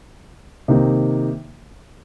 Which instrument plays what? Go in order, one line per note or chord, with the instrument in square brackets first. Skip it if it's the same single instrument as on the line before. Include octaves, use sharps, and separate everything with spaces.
[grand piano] C3 D#3 A#3 D#4